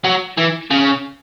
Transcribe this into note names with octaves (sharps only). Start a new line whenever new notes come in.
F#3
E3
C#3